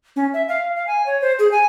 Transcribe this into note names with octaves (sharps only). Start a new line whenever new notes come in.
C#4
E5
F5
F5
G#5
C#5
C5
G#4
G#5